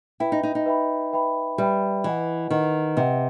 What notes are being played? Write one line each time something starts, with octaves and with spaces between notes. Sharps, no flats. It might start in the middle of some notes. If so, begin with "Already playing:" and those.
E4 B4 E5 G5 B5
D#4
D#4
D#4
B4 E5 G5 B5
B4 E5 G5 B5
G3 B4 E5 G5 B5
E3 B4 D#5 F#5
D#3 B4 D#5 F#5
C3 B4 D#5 F#5